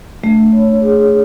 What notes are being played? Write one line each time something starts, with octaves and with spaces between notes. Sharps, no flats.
A3 D4
C#5
G#4